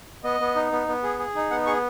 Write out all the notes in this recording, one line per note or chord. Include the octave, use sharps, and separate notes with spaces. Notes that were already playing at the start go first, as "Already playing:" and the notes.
B3 D#5
B3
D#4
B3
B3
G#4
G#4
D#4
B3 F#5
G#4 C#6